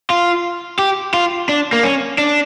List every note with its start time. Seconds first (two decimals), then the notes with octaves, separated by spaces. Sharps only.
0.10 F4
0.79 G4
1.14 F4
1.49 D4
1.73 A#3
1.83 C#4
2.18 D4